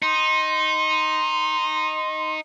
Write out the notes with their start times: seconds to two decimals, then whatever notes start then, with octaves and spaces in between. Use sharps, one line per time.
0.02 D#4 C6